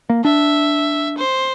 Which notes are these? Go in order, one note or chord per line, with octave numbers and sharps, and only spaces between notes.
A#3
D4 E5
C5